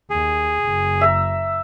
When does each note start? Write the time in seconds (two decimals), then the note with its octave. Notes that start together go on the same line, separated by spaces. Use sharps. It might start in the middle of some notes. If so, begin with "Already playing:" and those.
0.10 D#2 G#4
0.63 F#1
1.01 E5 A#5